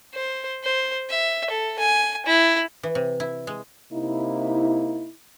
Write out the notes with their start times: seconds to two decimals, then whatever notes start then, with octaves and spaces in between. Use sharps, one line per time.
0.14 C5
0.63 C5
1.09 E5
1.50 A4
1.79 G#5
2.26 E4
2.83 E3
2.95 C3
3.20 E4
3.47 G#3
3.92 C3 A#3 D#4 E4